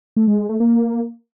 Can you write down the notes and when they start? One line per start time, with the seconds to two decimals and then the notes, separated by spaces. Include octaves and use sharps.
0.17 A3
0.27 G#3
0.38 G#3
0.49 A3
0.60 A#3